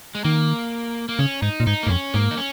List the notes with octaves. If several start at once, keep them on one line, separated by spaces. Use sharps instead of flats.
G#3
D#3 A#3
A#3
C#3 C#4
G#2 D#4
A#2
G#2 D#4
A#3
G#2
F2 C#4
G#2 A#3
D#4
C#4